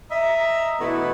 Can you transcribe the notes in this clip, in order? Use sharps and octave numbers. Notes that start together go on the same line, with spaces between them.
D#5 E5 A#5
B2 E3 A3 B3 D4 E4